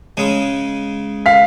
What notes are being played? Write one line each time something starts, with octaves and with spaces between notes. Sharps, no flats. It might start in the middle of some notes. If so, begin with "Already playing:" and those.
C#3 G#3
F5 B6